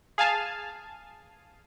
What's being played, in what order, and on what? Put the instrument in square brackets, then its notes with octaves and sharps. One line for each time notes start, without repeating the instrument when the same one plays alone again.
[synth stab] G#4 F5 G#5 A5